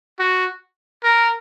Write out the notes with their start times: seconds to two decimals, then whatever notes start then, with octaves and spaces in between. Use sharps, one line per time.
0.19 F#4
1.04 A#4